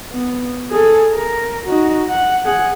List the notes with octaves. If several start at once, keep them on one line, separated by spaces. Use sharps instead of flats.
B3
G#4 A4
A#4
D#4 F#4
F#5
G#4 F#5